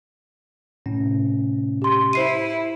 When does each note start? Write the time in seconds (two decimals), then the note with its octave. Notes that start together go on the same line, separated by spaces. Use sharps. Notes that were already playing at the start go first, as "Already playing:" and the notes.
0.86 A2 C3 C#4
1.82 G4 C6
2.13 E4 C5 C7 D#7